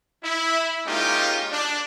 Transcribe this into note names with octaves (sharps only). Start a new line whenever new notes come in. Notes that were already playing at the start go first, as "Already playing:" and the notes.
E4
G#3 A#3 C#4 D#4 F4 G4
D4